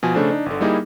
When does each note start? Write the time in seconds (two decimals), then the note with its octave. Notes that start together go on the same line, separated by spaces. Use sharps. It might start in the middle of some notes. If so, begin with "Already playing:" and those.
0.03 B2 F3 G#5
0.14 C#3 A3 D4 A4 C5
0.30 D4 D#4
0.46 G1 D3
0.61 G3 A#3 D#4 E4 G#4